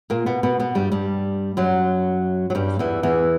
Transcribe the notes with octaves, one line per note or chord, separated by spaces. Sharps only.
A#2 A#3
B2 B3
B2 B3
B2 B3
G2 G3
G2 G3
F#2 F#3
F#3
G2 G3
E2 E3
E2 E3